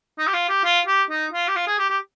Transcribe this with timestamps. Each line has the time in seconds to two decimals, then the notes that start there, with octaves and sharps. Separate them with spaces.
0.18 D#4
0.27 G4
0.34 F4
0.49 G4
0.64 F4
0.87 G4
1.10 D#4
1.33 F4
1.48 G4
1.56 F4
1.67 G#4
1.79 G4
1.90 G4